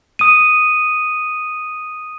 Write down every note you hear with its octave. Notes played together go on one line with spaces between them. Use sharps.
D#6 D#7